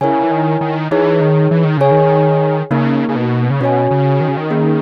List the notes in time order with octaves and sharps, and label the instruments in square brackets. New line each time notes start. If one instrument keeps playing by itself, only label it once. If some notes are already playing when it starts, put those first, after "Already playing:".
[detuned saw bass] C#3 [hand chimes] E4 A#4 C#5 G#5
[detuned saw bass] E3
D#3
D#3
[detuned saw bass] E3 [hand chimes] D#4 G#4 C#5
[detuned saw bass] D#3
E3
D#3
[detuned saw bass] C#3 [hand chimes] G#4 C#5 G#5
[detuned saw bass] D#3
[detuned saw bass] C#3 [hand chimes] A#3 D#4 A#4
[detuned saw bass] C#3
B2
C#3
[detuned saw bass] B2 [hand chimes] C#4 F#4 C#5 G#5
[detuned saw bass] C#3
D#3
C#3
D#3
[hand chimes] A#3 C#4 G#4